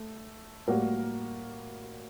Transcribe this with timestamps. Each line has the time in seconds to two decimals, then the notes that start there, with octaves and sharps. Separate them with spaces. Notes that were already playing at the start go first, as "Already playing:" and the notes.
Already playing: A3
0.67 A2 G3 A#3 F#4 A#4